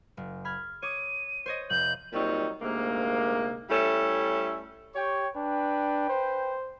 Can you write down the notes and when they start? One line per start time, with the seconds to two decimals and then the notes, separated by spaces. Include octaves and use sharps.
0.17 F#1
0.45 B5 F6 G#6
0.82 C#5 D6 D#6 D#7
1.46 C5 C#5 D#5
1.70 F1 G6 F#7
2.13 A#2 F#3 G3 C4 D#4
2.61 D2 G#2 C3 A#3
3.70 G3 A3 C#4 E4 A4
4.95 G4 C#5 G5 C#6
5.36 D4 B4 G5
6.09 C5